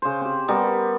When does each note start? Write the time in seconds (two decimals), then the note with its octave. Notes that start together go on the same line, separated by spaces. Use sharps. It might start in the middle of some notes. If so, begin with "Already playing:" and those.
0.02 C#3 C5
0.21 C4 G4
0.48 G3 B3 A#4